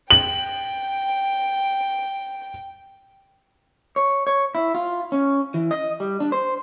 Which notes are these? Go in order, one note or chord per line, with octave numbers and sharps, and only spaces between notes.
G5 F#7
C#5
C#5
E4
F4
C#4
E3
D#5
G3
D4
C5